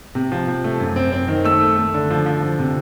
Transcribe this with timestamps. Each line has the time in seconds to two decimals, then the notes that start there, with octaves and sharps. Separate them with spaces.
0.15 C3
0.32 F3
0.48 C3
0.64 A3
0.80 F#2
0.96 C4
1.12 C4
1.28 D#3
1.44 A3 E6
1.61 A3
1.77 A3
1.94 D3
2.10 F3
2.26 F3
2.42 F3
2.59 C3